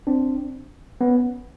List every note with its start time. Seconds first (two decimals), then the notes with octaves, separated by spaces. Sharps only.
0.07 C4 D4
1.01 B3 C#4